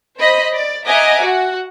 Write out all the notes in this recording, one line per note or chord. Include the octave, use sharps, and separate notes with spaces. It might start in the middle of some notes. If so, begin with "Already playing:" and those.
C5 D#5 B5
D5
D#5 E5 F#5 G#5 A#5 D6
F#4 F#5